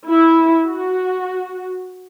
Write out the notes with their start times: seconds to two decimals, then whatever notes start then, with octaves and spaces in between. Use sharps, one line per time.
0.10 E4
0.67 F#4